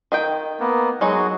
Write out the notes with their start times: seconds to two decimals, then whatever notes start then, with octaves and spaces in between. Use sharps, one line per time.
0.12 D#3 D#5 G5
0.60 A#3 B3
1.01 F#3 G#3 D#4 F#4 G#4 C#5